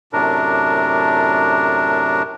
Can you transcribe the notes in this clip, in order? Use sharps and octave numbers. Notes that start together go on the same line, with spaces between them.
F#2 A2 C3 D4 A#4